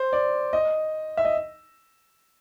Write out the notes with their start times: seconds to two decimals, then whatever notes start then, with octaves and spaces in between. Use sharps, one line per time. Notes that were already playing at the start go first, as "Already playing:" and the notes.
Already playing: C5
0.13 D5
0.53 D#5
1.17 E5
1.25 D#5